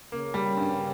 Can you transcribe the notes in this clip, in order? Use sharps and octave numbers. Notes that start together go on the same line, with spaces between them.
C#3 A#3
G3
G2